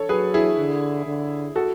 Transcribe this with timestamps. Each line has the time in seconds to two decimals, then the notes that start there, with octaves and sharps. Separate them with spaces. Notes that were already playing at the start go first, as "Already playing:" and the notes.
Already playing: A4 C#5
0.09 F#3 G#4 B4
0.34 E4 G#4
0.58 D3
1.06 D3
1.56 F#4 A4